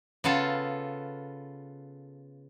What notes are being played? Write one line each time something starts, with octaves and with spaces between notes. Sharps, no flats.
C#3 B3 F4 A4